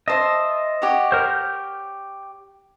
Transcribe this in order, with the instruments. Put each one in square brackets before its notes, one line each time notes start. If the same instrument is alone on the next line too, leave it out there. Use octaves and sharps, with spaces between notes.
[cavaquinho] C5 E5 [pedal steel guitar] D#5 A5
[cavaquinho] G4 C#5 F#5
[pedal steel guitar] A#4 C5
G6